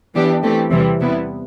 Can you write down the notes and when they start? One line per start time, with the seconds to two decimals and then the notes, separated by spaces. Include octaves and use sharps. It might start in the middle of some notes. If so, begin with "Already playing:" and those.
0.14 E3 B3 D4 G4
0.43 E3 A3 C4 G4
0.71 E2 C3 E3 G3 C4
1.00 C3 G3 B3 E4